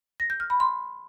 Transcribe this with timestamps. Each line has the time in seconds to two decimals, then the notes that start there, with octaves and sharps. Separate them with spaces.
0.20 A#6
0.30 G6
0.40 F6
0.50 B5
0.60 C6